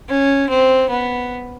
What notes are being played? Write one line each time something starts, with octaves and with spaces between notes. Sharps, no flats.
C#4
C4
B3